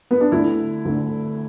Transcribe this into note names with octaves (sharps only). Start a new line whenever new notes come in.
B3
D4
D2 D3 E4
D2 D3